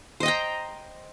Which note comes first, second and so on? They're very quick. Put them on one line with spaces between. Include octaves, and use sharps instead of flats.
C5 D#5 G5 A#5